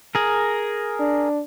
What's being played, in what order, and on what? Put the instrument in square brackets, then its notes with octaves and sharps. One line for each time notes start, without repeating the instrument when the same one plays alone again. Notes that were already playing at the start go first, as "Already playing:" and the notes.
[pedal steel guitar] G#4 A#4
[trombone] D4